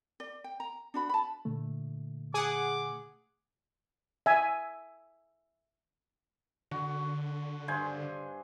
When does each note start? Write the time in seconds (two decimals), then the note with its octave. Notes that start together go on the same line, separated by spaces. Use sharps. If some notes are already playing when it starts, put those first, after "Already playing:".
0.20 D5
0.44 G5
0.60 A#5
0.94 D4 F#4 B5
1.09 A5 B5
1.45 A#2 D3 A3
2.34 G#4 F#5 D6
4.26 E5 G#5
6.71 D3 F#4
7.68 G2 C5 G#5